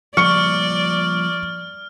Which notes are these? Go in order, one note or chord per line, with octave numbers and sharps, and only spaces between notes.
F3 G3 A#3 D5 C#6 F6 C#7